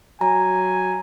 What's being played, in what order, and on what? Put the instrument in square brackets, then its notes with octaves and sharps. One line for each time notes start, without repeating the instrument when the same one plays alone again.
[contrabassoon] F#3 [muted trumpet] G#5 [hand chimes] A#5